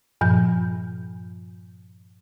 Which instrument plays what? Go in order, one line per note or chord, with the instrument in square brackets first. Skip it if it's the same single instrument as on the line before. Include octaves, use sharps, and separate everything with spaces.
[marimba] G2 A#2 F3 G6